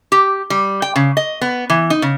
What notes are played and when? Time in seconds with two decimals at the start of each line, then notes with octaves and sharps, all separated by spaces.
0.12 G4
0.50 G3
0.82 G5
0.96 C#3
1.17 D#5
1.41 B3
1.70 E3
1.90 D#4
2.02 C#3